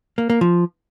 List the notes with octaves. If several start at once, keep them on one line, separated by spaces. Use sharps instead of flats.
A#3
A#3
F3